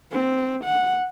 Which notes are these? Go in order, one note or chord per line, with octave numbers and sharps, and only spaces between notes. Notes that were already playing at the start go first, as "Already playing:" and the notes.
C4
F#5